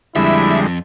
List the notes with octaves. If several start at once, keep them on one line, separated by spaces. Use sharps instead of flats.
F2 D3 G3 G#3 E4 E5